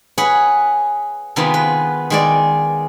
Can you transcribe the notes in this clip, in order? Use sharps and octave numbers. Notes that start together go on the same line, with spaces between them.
G#4 B4 C#5 F#5
C3 D#3 G#3 B3 F4
B4
D#3 G#3 D5